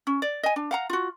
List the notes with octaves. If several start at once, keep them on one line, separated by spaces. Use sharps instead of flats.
C#4
D5
D#5 G#5
D4
F5 F#5 A#5
F4 F#4